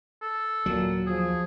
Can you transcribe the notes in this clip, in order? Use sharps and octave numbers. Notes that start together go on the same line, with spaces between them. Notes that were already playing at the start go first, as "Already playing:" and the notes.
A4
D#2 A#2 F#3
F3 G#4